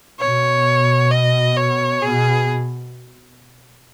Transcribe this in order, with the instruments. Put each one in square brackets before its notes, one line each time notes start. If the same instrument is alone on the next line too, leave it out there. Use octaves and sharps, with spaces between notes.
[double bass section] B2 [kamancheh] C#5
[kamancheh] D#5
C#5
[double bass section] B2 [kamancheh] G#4